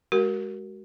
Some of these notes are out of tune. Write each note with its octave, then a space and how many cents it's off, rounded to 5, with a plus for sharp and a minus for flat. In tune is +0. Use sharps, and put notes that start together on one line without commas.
G#3 +0 F#4 +35 A#4 +0